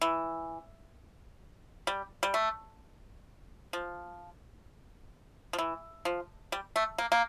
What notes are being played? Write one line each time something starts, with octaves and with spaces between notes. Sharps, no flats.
E3
G3
G3
A3
F3
F3
E3
F3
G3
A3
A#3
A#3